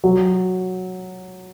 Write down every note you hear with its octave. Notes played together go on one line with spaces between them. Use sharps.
F#3